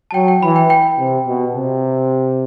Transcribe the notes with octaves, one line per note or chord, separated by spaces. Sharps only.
A5
F#3 G5
G5
E3 B5
G5
G5
C3
B2
C3